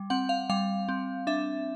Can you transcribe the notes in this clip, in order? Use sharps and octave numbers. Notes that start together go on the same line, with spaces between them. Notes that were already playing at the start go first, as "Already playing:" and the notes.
Already playing: G3
C4 F#5
F5
G3 F5
C4
D4 E5